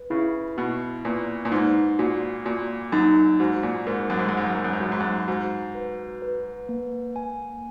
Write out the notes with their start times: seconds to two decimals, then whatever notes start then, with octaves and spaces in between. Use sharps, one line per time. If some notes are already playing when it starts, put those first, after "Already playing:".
Already playing: B4
0.10 C#3 E4
0.57 B2 E4
1.05 A#2 B4
1.45 A#2
1.52 G#2 D#4
1.99 A#2 F#4
2.46 A#2 F#4
2.92 F#2 D#4
3.40 G#2 F#4
3.63 A#2
3.87 G#2 A#4
4.10 F#2
4.19 G#2
4.29 F#2
4.33 G#2 D#5
4.46 F#2
4.55 G#2
4.64 F#2
4.73 G#2
4.81 F#2 F#4
4.92 G#2
5.00 F#2
5.28 G#2 F#4
5.75 B4
6.22 B4
6.69 A#3
7.16 G#5